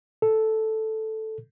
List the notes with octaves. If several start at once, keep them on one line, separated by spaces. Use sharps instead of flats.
A4